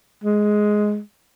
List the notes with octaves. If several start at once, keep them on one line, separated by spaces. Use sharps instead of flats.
G#3